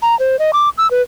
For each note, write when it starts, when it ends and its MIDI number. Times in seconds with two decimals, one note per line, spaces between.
0.02 0.18 82
0.20 0.39 72
0.39 0.51 75
0.53 0.69 86
0.78 0.90 88
0.91 1.02 71